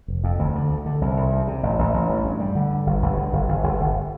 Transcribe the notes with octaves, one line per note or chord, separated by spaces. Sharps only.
F1
F2
D2
D3
D2
D3
C2
C2
C3
C3
A1
A1
A1
G2
G2
G3
D3
G2
G1
G1
G2
G1
G1
G1
G1